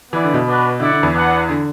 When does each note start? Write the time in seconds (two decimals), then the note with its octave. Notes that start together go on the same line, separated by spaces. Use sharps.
0.11 E3 B3 E4 B4 D5
0.24 D3
0.34 B2
0.46 D4 F#4 B4
0.80 D3 E4 D5 F#5
0.91 D3
1.03 E2 E3
1.13 D4 B4 F#5
1.49 D3